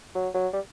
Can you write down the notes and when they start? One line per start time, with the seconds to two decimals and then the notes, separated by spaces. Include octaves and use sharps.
0.15 F#3
0.34 F#3
0.53 G3